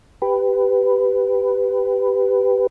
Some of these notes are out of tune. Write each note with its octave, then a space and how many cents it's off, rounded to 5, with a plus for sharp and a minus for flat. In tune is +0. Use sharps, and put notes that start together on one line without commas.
G4 +0 B4 +10